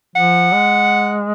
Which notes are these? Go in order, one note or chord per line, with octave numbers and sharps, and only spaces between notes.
F3 F#5
G#3